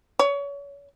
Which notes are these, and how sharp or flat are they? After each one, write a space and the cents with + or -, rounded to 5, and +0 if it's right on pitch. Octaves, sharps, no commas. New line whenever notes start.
C#5 +30